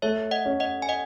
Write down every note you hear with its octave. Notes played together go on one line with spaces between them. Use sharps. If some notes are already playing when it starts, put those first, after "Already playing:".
A3 C#5 E5
D#5 F#5
C#4
D#5 F#5
G#5
D#5 F#5